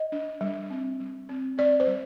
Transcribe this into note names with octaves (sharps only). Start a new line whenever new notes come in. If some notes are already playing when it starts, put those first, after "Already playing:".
Already playing: D#5
D4
G3
C4
G3
C4
C4 D5
C5
G3